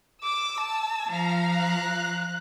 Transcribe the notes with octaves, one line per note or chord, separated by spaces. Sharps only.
D6 E6
A5
F3 F5 A#5
F#6